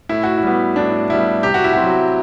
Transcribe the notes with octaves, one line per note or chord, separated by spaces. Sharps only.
A2 E4
F#4
E4
G3 B3
A2 D4
G3 B3 E4
C3 G4
F#4
E4
C4 F#4
F#3